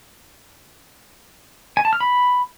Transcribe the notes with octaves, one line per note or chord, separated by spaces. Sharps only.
G#5
A5
F6
B5